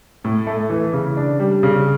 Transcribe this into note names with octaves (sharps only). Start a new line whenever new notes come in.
A2
A3
E3
C#3
D4
G3
C#3